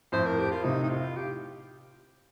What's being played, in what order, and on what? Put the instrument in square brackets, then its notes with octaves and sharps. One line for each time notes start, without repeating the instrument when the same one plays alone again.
[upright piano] F2 A2 [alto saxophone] C5
[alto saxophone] A#4
G4
F4
[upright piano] A2 C3 [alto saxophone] D#4
[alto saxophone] D#4
F4
G4